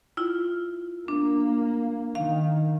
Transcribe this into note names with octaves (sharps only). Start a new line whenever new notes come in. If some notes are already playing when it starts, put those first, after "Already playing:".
E4 F4
A#3 D4
D#3 F5